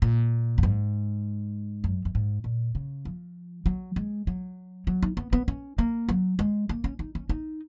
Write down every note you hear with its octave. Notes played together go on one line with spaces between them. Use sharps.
A#2
F#2
G#2
F#2
F#2
G#2
A#2
C#3
F3
F#3
G#3
F#3
F#3
D#4
B3
B3
C#4
A#3
F#3
G#3
A#3
C#4
D#4
C#4
D#4